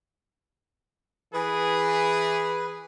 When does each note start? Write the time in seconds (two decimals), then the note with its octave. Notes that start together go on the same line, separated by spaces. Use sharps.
1.33 E3 G#4 B4